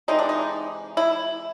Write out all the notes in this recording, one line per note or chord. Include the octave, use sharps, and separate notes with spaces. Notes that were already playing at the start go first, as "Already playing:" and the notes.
C3 E3 G#3 D#4
D4
D#4
E4